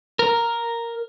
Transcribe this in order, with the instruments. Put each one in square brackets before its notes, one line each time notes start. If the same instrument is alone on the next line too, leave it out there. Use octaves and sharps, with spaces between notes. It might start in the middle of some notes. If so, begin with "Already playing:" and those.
[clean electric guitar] A#4